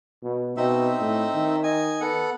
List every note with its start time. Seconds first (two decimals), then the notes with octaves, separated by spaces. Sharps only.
0.23 B2
0.57 B2 C4 D#4 E5
1.00 A2
1.35 D#3
1.63 D#5 G#5
2.01 B3 A4 F#5